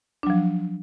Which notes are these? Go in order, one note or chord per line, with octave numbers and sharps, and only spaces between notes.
F3 F#3 D4